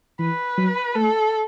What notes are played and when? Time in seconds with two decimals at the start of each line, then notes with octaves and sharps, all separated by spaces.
0.19 E3 B4
0.58 F#3
0.96 A3 A4